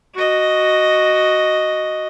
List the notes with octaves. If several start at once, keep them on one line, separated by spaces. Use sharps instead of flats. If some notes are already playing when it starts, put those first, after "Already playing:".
F#4 D#5